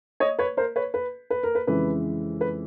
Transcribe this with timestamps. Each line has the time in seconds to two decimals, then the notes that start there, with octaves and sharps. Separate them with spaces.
0.20 C#5 D#5
0.39 B4 C#5
0.57 A#4 C5
0.76 B4 C#5
0.94 B4
1.30 B4
1.43 A#4
1.55 B4
1.67 F2 C#3 E3 G#3 B4
2.41 B4